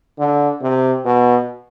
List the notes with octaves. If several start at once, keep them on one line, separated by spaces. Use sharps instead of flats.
D3
C3
B2